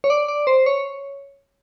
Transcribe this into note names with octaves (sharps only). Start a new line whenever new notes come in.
C#5
D5
D5
C5
C#5